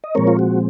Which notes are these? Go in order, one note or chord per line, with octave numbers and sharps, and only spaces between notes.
D#5
A#2 F3 G#3 C4 A#4 C#5
F4
F#4